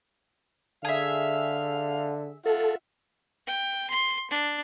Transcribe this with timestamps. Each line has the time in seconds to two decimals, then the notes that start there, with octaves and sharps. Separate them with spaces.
0.85 D3 G#4 E5 F5
2.46 F4 A4 E5 F#5
3.47 G5
3.90 C6
4.30 D4